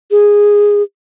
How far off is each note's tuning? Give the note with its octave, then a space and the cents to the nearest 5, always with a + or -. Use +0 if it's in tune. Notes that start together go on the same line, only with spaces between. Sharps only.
G#4 -10